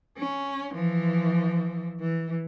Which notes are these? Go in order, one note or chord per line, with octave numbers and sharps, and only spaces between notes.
C#4
E3 F3
E3